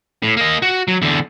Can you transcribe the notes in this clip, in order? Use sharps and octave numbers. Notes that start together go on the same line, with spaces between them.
A2
A#3 D#5
F#4
F#3
E2 D3